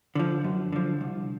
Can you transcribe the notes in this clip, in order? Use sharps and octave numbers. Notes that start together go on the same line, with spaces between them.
D3 F3
F#2
D3 F3
C2